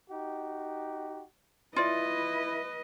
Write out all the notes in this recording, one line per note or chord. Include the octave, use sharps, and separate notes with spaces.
D#4 F#4 G4
E4 F4 B4 D5 D#5